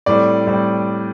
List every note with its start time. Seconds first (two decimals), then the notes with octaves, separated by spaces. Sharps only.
0.06 A2 G3 C4 D5
0.46 A2 G3 C4